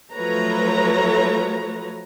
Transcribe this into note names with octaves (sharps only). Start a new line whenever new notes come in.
F3 F#3 A3 B4 C#5 A#5